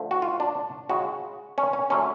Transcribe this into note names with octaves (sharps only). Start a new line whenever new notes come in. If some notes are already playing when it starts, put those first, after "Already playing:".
Already playing: D3 F3 A3
F#4
F4
D4
C#3 G#3 F#4
C#4
C#4
D3 F#3 A3 C#4